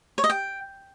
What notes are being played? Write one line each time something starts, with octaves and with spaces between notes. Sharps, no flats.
C#5
D#5
G5